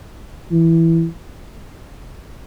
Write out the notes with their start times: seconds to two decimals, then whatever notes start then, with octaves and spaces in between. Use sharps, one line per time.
0.52 E3